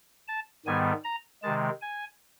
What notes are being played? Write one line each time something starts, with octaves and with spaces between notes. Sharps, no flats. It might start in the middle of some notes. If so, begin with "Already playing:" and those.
A5
G#2 D#3 G3 B3 G#5
A#5
C3 D#3 G#3 A5
G#5